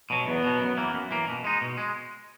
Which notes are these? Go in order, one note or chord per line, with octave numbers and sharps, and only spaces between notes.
B2 F#3
E2 B3
B2 F#3
F#2
E3 A#3
F#2
E3 A#3
B2
G#3 D#4
B2
G#3